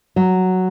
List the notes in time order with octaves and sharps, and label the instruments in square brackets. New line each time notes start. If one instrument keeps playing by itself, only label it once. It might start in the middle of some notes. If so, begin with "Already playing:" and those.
[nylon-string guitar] F#3